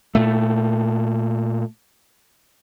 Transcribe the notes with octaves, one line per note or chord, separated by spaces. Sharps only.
A#2 A3